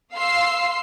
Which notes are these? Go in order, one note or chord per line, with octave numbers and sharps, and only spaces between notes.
F5 C6 E6 C7